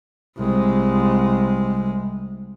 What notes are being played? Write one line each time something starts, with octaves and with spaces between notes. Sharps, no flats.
C2 G#3